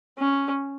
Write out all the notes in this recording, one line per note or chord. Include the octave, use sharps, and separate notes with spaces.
C#4